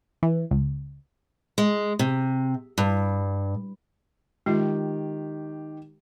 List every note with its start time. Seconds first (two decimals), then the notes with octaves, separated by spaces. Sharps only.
0.23 E3
0.51 C#2
1.58 G#3
1.99 C3
2.78 G2
4.46 D#3 G#3 F4 G4